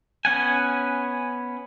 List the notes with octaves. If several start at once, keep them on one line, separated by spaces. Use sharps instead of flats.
B3 C#4 F#5 G#5